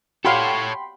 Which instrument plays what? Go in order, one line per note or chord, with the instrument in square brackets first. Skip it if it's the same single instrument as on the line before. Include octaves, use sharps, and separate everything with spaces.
[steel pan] F#4 G4 F5 [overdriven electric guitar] A4 C#5 [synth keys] G5 B5 C6